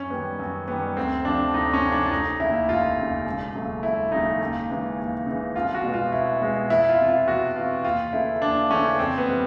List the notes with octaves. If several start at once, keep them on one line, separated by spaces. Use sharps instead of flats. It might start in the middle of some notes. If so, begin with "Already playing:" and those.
Already playing: F#2 C#4
D#3 G3 B3
F#2
D#3 G3 B3
D2 C4
C3 F3 D4
D2 D#4
C#4
C3 F3
D4
D4
F1 D#4
D#2 C#3 E4
F1 F4
D#2 C#3
E1
D#2 C#3 F#3 A3
E1 E4
D#2 C#3 F#3 A3 D#4
D#2
C#3 E3 G#3
D#2
C#3 E3 G#3
C2 F4
F#4
B2 G#3 B3
F4
C2 E4
B2 G#3 B3
E2 E4
F4
C3 E3
F4
E2 F#4
C3 E3 F4
D#2 F4
C#3 E3 A3 E4
D#2 D4
C#3 E3 A3 C#4
F2 C4
B3
C3 E3 G3